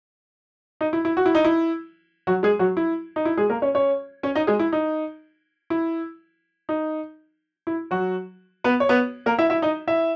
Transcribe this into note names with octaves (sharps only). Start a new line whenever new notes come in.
D#4
E4
E4
F#4
E4
D#4
E4
F#3 F#4
G#3 G#4
F#3 F#4
E4
D#4
E4
G#3 G#4
A#3 A#4
C#4 C#5
C#4 C#5
C#4 C#5
D#4 D#5
G#3 G#4
E4
D#4
E4
D#4
E4
F#3 F#4
B3 B4
C#5
B3 B4
A#3 A#4
E4 E5
E4 E5
D#4 D#5
E4 E5